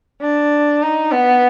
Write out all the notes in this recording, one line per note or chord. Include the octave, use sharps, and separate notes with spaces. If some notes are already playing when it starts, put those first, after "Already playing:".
D4
D#4
B3